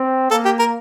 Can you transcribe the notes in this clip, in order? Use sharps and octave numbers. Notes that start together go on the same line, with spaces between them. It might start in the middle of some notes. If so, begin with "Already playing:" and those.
Already playing: C4
A#3 A4
G4
A#4